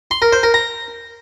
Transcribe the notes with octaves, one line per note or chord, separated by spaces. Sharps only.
C6
A#4
C5
A#4
A#5